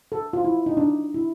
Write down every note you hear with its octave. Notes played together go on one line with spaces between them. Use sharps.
A4
F4
E4
D#4
D4
E4